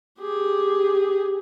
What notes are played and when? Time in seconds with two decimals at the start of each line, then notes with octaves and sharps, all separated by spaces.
0.19 G4 G#4